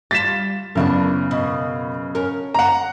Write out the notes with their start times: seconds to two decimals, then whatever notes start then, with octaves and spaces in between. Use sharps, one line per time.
0.11 G3 F4 A6 B6 E7
0.75 F#2 C#3 B3 D4 E4 A#4
1.31 B2
2.15 C#4 A#4
2.54 F#5 A#5